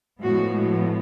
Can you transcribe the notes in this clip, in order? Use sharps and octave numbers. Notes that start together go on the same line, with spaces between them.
A2 F3 G#3 B3 F#4